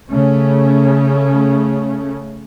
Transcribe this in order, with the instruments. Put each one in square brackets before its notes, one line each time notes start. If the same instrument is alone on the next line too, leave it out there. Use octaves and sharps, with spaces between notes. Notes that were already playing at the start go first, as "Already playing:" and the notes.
[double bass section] C#3 A3 C#4